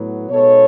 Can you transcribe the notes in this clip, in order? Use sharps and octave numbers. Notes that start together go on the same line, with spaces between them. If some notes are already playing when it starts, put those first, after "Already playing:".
Already playing: A2 F#3 B3
B2 G#3 B3 D#4 A4 C#5